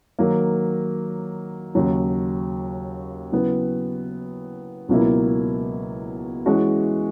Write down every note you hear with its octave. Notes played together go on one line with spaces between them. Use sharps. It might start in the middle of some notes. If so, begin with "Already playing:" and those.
D#3 F#3 A#3
D#2 C#3 F#3
C#3 F#3 B3 E4
C#2 B2 F#3 A#3 E4
E3 G#3 C#4 F#4